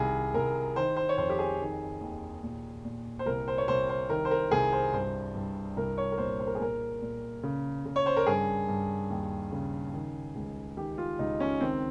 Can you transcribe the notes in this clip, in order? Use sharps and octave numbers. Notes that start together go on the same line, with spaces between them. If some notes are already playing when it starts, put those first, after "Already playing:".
Already playing: C2 D#3 G#4
C2 A#4
D#3 C5
C5
C#5
F2 C5
G4
G#4
D#3
D#2
A#2
A#2
C5
C2 A#4
C5
C#5
C2 C5
C5
D#3 A#4
C5
A#4
C2 G#4
C5
G2 C5
G2
C2 A#4
C#5
A#4
A#2 C5
C5
A#4
G#4
A#2 A#4
A#2
C#3
C#3
C#5
C5
A#4
G2 G#4
G2
D#2
C#3
D#3
C#2
D#3 G4
F4
C#2 D#4
C#4
D#3 C4